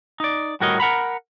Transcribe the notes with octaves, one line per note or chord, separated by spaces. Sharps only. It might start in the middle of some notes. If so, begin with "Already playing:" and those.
D#4 D5
A2 G3 F#4 A#4 C#5 D#5
A#4 F#5 A#5 B5